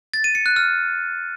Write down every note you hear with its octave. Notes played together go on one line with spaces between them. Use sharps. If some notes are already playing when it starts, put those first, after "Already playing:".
A6
D#7
C#7
F#6
F6